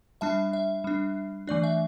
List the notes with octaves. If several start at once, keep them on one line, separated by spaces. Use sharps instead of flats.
G3 D4 E5 A5
E5
G3 D4
E3 A3 D4 D5
E5